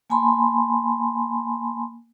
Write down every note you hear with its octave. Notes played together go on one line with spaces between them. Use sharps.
A#3 G#5 A5 B5 C6